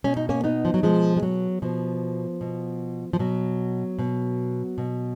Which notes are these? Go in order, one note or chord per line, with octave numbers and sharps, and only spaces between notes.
B2 C#4
D#4
A#3 C#4
B3 D#4
F3
F#3
B2 F3 G#3
G#3
F#3
B2 F3
B2
F3
B2 F#3
B2
B2